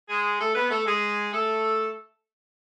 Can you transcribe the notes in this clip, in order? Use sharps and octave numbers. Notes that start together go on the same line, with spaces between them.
G#3 G#4
A3 A4
B3 B4
A3 A4
G#3 G#4
A3 A4